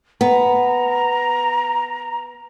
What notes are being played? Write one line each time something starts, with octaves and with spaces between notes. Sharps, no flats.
B3 A#5